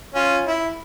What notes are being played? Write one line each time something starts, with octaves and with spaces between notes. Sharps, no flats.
C#4 F4
E4